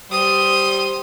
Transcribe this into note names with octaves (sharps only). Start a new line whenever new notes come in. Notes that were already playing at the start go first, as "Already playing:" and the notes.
G3 C5 C6 D#6